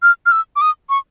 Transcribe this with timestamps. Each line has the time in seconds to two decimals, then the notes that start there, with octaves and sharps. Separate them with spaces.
0.03 F6
0.26 F6
0.32 E6
0.56 D6
0.61 D#6
0.90 C#6